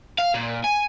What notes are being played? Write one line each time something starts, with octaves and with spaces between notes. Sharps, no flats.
F5
A#2
G#5